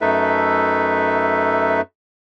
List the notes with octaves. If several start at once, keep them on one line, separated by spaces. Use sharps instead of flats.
F#2 A3 D#4 A4 B4 E5